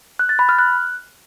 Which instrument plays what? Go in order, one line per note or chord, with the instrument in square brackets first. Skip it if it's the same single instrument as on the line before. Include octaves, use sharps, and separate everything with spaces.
[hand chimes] F#6
A6
B5
F6
F#6